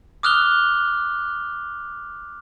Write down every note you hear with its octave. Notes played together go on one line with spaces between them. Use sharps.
D6 D#6 F6 F#6 F7 G7